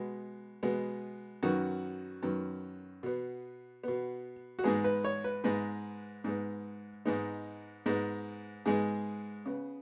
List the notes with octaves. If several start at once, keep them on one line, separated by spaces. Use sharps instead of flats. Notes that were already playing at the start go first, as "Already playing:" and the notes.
Already playing: B2 G#3 B3
B2 G#3 B3
F#2 D#3 B3 F#4
F#2 D#3 B3
B2 B3
B2 B3
F#4
G#2 G#3 B3 G#4
B4
C#5
B4
G#2 G#3 B3 B4
G#2 G#3 B3
G#2 G#3 B3 D#4
G#2 G#3 B3
G#2 G#3 B3 G#4
C#3 B3